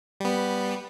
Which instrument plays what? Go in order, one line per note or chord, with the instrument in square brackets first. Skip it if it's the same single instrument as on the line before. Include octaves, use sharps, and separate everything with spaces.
[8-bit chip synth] G3 B3